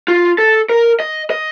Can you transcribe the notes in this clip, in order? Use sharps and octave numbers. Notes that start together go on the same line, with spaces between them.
F4
A4
A#4
D#5
D#5